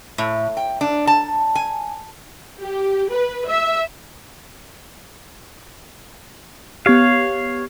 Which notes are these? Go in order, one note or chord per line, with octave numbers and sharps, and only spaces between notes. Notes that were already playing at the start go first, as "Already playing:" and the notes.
A2
G5
D4
A5
G#5
G4
B4
E5
B3 G4 C#5 F5